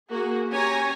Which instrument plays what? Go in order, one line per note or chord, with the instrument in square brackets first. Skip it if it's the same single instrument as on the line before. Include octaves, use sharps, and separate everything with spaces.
[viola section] A#3 F#4 G#4
C#4 G4 C#5 G#5 A#5